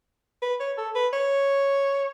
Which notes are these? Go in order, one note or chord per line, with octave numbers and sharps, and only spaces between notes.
B4
C#5
A4
B4
C#5